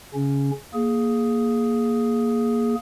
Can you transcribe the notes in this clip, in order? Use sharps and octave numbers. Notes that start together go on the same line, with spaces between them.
C#3 C#4
A#3 G#4